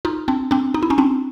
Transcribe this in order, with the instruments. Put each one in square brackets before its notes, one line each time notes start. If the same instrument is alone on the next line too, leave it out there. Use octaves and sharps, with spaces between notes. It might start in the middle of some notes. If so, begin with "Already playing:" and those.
[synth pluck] D#4 F4
C4 D4
C4 D4
D#4
E4
C#4 D#4
C4 D4